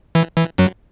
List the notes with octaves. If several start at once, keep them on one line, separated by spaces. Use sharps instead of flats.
E3
E3
F#2 F#3